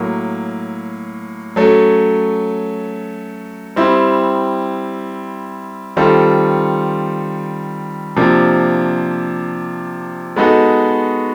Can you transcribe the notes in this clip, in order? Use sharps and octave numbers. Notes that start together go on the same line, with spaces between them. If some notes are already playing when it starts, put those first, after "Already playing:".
Already playing: A2 F#3 A#3
F#3 A3 C#4
G3 C4 E4
D#3 G3 C4 F4 A4
C3 F3 A#3 D4
G#3 B3 D#4 F#4 A4